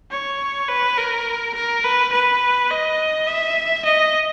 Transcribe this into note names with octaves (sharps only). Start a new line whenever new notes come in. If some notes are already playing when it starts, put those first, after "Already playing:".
C#5
B4
A#4
A#4
B4
B4
D#5
E5
D#5